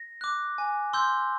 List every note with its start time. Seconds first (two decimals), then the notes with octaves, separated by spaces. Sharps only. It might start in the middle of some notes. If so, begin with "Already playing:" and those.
Already playing: A#6
0.21 D6 F#6
0.58 G#5
0.93 C6 E6 G6